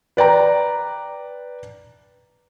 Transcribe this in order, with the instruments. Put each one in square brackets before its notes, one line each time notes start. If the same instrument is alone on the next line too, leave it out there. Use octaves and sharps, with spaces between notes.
[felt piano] B4 D5 G5 A#5